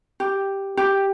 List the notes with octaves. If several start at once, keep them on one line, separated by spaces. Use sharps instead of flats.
G4
G4